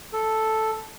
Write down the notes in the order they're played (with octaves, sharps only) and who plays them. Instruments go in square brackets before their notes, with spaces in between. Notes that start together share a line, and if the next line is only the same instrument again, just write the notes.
[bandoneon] A4